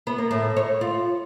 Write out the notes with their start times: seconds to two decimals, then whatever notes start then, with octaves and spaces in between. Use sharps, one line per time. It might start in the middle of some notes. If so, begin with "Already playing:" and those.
0.07 B3
0.18 A#3
0.31 A2
0.57 C#5
0.81 F4